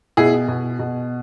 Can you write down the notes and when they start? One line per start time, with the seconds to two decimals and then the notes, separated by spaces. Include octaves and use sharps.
0.17 B2 E4 G#4
0.48 B2
0.79 B2